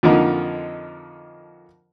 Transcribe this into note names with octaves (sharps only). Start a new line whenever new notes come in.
F2 D3 F3 A#3 D#4